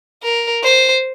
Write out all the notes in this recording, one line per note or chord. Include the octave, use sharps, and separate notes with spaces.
A#4
C5